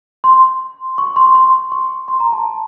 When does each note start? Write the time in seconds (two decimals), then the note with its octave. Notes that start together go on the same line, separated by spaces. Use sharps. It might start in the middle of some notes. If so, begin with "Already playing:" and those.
0.24 C6
0.98 C#6
1.16 C6
1.27 C#6
1.35 C6
1.72 C#6
2.08 C6
2.20 A#5
2.33 A5
2.45 A5